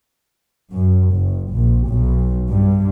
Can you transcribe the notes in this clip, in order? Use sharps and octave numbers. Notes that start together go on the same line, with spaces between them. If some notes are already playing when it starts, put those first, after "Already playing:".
F#2
F#1
A#1
B1
G2